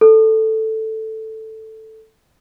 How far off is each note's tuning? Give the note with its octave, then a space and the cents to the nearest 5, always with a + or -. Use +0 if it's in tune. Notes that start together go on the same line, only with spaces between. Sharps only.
A4 +5